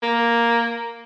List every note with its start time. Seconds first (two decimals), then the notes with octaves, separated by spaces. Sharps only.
0.03 A#3